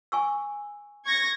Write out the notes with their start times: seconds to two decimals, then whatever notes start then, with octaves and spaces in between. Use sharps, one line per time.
0.12 G#5 C#6 E6
1.05 C#6 G#6 A#6